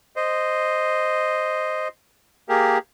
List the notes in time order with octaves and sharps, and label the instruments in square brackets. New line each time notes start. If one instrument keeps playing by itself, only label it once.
[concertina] C5 D#5
A#3 G4 G#4 A#4